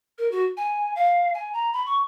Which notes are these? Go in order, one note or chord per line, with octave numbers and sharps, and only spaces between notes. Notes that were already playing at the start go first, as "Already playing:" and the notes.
A#4
F#4
G#5
F5
G#5
A#5
B5
C#6